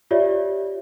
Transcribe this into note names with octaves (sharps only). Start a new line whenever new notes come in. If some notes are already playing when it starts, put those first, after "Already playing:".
F4 G4 C#5 D5 E5